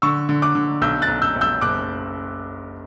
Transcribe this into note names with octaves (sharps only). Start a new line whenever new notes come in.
D3 C#6 E6
D3
D6 F#6
D3
B1 E6 G6
F#6 A6
B1
E6 G6
B1
E6 G6
F#1 D6 F#6